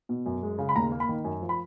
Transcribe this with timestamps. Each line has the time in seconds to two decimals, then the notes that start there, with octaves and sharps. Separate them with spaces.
0.09 B2
0.26 F#2
0.43 G#3
0.58 C#3
0.69 B5
0.76 D#2 A#5
0.92 A#3
1.00 B5
1.09 D#3
1.24 F#2
1.42 F3
1.49 B5